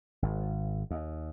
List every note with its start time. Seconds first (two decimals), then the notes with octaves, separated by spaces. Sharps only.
0.22 G#1
0.91 D#2